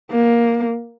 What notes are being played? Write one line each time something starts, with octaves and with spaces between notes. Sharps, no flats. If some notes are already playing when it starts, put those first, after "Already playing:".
A#3